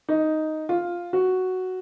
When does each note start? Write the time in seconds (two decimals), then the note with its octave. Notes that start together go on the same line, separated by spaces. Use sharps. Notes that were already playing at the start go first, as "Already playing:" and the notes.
0.09 D#4
0.69 F4
1.13 F#4